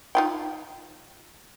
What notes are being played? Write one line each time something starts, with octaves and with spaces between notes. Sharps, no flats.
D#4 F4 G5